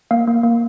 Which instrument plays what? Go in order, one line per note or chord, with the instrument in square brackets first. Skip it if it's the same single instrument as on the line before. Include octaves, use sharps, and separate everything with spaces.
[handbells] A#3 F5
A#3
A#3